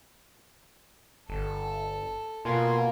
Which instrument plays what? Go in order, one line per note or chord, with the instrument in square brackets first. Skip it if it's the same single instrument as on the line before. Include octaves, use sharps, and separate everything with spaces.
[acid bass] G1 [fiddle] A4
[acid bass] B2 [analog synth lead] A#3 [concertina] F4 G#5 C6